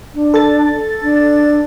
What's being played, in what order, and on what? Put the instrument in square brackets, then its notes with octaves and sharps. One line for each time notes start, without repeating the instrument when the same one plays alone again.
[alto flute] D4
[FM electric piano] A4 A6
[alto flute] D4